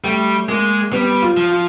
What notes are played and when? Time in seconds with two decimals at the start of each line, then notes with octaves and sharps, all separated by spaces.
0.04 G3 A3
0.49 G#3 A#3
0.92 G3 B3
1.22 F4
1.37 F3
1.52 F4